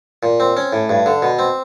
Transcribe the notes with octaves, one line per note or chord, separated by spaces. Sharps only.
A#2
C4
C#4
A2
G2
D3
B2
C4